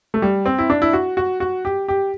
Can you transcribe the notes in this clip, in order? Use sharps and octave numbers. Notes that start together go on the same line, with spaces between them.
A3
G3
C4
E4
D4
E4
F#4
F#4
F#4
G4
G4